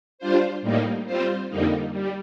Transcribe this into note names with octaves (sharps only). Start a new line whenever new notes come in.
G3 D4 F4 C5
A2 G3 A#3 D#4
G3 C4 F4 C5
F2 D3 G3 A#3 D#4
G3